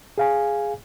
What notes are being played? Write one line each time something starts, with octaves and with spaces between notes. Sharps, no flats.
G#4 F5 G#5